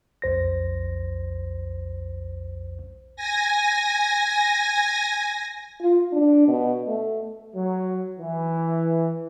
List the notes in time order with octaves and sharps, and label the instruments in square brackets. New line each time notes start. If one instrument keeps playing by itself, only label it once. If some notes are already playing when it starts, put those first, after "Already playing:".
[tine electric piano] B1 F2 C5 A#6
[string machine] G#5 A#6
[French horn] F4
D4
B2
A3
[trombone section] F#3
E3